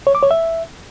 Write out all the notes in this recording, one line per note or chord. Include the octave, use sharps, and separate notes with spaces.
C#5
D6
C#5
E5